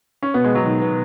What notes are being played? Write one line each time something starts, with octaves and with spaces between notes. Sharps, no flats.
C#4
B2 B3
G#3
F#3
D#3
B3